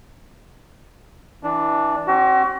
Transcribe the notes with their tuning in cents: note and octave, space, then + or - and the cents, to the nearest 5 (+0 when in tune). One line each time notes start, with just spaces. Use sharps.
E3 -15 D4 +0
C4 +45 F#4 +40